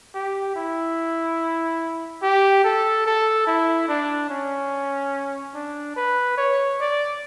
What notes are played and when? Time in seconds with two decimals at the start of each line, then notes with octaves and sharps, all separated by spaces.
0.15 G4
0.56 E4
2.23 G4
2.64 A4
3.06 A4
3.47 E4
3.88 D4
4.30 C#4
5.54 D4
5.96 B4
6.37 C#5
6.80 D5